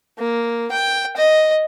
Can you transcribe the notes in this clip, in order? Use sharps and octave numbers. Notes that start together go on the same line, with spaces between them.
A#3
G5
D#5